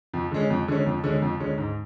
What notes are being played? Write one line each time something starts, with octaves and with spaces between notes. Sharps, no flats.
F2
D3 G#3 C#4
F2
D3 G#3 C#4
F2
D3 G#3 C#4
F2
D3 G#3 C#4
G#2